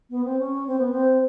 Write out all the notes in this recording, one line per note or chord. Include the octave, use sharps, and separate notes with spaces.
B3
C4
C#4
C4
B3
C4